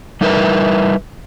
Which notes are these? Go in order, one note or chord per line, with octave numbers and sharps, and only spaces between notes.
G3 D#4 E4 A#4 B4